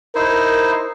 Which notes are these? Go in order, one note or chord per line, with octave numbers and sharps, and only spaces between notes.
D#4 E4 A#4 C5